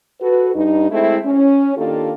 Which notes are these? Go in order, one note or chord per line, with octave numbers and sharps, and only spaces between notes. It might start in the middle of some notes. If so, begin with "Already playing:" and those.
F#4 A4 B4
G2 D#4
G#3 A3 C4 E4
C#4
D#3 A#3 D4 F4 G4 A4